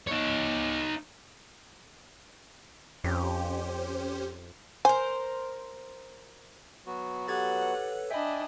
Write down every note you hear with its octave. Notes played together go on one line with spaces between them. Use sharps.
D#4 C#5
F2 C#4 G4 C5
A#4 C5 G#5
F#3 B3 F#4
G4 A4 B4 C#5 F#5 G#6 A6
D4 D#5 E5 G5 G#5 B5